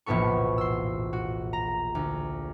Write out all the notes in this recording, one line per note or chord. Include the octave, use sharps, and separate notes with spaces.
E1 A#1 A2 B3 A4 C#6
C6 E6
F#4
A#5
D2